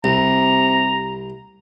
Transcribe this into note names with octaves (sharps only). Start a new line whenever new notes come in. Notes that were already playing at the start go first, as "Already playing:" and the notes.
C2 C3 A#5